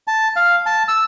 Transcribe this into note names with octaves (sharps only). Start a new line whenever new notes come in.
A5
F5
A5
E6